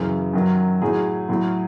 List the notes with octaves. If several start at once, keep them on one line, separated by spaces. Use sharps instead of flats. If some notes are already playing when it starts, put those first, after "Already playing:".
Already playing: F#2 C#3 E3
F#2 D#3 F#3
A2 F#3 G#4
A2 F#3